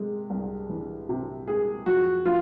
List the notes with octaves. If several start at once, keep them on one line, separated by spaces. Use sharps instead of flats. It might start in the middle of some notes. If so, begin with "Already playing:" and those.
Already playing: C3 G#3
C2
E3
C3
G#3 G#4
F2 F#4
F3 F4